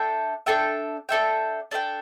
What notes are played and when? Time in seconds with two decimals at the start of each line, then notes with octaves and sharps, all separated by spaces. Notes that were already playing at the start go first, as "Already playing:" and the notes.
Already playing: D4 A4 E5 G5
0.46 D4 A4 E5 G5
1.09 D4 A4 E5 G5
1.71 D4 A4 E5 G5